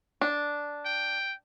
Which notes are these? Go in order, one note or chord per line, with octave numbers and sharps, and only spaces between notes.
D4
G5